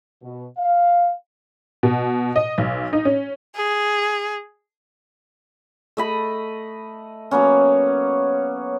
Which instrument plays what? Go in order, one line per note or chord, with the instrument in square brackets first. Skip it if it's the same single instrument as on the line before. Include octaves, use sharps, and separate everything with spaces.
[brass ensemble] B2
F5
[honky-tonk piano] B2
D#5
B1
D#4
C#4
[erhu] G#4
[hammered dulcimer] A3 D#5 B5
F#3 A#3 B3 C#4